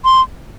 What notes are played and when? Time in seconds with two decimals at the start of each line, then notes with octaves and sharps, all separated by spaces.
0.05 C6